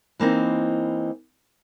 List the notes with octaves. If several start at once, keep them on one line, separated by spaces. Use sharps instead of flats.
E3 A#3 C4 D#4